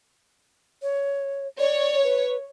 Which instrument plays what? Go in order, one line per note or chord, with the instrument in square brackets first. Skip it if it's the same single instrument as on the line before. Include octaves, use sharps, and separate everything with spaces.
[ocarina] C#5
[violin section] C#5 [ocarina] D5
[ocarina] B4